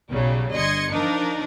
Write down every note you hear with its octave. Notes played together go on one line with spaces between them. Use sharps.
B1 C#3 F#3 G3
G1 D#5 C6 G#6 C#7
F3 D4 D#4 A#4